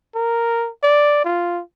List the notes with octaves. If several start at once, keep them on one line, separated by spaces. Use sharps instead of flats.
A#4
D5
F4